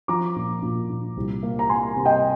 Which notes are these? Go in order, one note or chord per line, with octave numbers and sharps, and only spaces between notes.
F3 A#5 D6
A#2
A#2
A#2
C2
A#3
A#5
A#3 G#5 C6
C3
D#5 G5